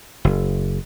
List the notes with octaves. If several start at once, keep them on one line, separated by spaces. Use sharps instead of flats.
F#1